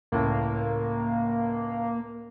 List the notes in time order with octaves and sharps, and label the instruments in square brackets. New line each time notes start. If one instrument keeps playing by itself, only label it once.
[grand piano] C#2 A2 [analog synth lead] A#3